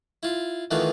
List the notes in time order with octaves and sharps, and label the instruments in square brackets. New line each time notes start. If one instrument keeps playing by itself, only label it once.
[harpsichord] E4 F4
D#3 E3 A3 B3 D#4 F4